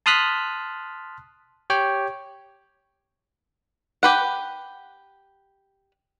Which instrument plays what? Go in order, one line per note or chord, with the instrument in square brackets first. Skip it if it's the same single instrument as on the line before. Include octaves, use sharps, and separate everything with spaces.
[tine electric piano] A5 C6 D#6 F6 F#6 B6
G4 C#5 G5
[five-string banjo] G4 B4 F#5